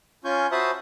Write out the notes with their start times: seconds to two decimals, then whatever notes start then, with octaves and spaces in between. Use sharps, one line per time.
0.25 C#4 F4 G#5 C#6 G6
0.52 F#4 C5 E5 A5 B5 D#6